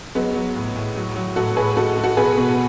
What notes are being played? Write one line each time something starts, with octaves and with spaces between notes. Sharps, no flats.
F#3 G#3 B3
F#3
A2
A2
F#3
F#3
A2 F#4 A4
A2 G#4 B4
G#3 F#4 A4
G#3
F#4 A4
B2 G#4 B4
B2